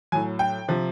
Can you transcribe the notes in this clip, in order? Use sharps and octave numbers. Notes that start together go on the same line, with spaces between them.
A2 F#3 G#5
G5
C3 F3